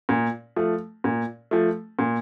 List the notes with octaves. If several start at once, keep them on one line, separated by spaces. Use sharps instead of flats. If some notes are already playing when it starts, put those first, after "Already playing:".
A#2
F3 A3
A#2
F3 A3
A#2